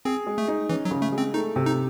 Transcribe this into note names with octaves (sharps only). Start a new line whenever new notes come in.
C4 G#4
G#3
A3
D#4
E3 C#4
F#3
C#3
A3
G#3
C4
A3 D#4
C3
D#4